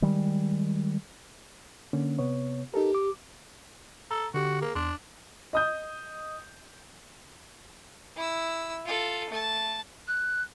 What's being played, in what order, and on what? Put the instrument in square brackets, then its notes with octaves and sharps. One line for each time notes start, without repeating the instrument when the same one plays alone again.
[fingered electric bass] D#3 G3 G#3
[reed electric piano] D3 A#3 C#4
C3 B3 C#5
[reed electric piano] D#4 A4 A#4 [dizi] G4
[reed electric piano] D6
[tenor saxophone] A4 [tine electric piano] A#5
[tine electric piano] D3 G4 [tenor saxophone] F#4
[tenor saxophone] A#3 [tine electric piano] G#4
[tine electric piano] E2 C6 [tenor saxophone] D4
[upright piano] D#5 D#6 G6
[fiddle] E4 E6
F4 A4
A3 A5
[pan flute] F#6